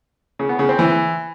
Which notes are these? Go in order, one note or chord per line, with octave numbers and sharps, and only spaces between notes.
C#3
B3
C#3
C4
E3